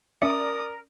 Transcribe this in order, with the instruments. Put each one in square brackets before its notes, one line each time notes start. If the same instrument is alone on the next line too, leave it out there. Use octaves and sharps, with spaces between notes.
[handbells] C#4 E5 C#7 [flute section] A#4 [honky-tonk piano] D5 [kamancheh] D#6